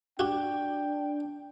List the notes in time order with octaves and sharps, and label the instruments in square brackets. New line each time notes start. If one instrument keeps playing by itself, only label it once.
[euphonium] D4 [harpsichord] F#4 G4 [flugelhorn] G5